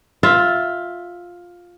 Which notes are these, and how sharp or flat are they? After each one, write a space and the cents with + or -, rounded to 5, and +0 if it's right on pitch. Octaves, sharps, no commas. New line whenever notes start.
F4 +10 E5 +0